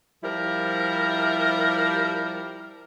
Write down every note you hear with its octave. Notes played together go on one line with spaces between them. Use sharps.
F3 G3 E4 A#4